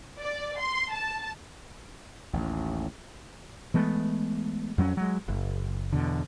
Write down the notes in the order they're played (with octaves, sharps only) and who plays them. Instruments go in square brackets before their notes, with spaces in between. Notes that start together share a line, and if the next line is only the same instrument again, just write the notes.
[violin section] D5
C6
A5
[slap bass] A1 D#2
[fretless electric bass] E3 G#3 A3 B3
F2 F#3 B3 C#4
F#3 G#3
F#1
E2 B2 D3